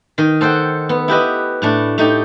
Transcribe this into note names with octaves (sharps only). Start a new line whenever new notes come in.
D#3 D#5
A4 C5 F#5 G5
B3
E4 G4 B4 D#5
A2 A3 D4
A3 D#4 G4